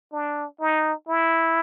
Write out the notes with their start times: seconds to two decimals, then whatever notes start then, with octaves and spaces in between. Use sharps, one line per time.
0.12 D4
0.60 D#4
1.08 E4